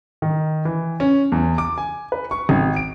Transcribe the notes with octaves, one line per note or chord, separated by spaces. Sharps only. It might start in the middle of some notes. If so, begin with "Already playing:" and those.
D#3
E3
C#4
E2
D6
G#5
B4
C#6
G#1
D7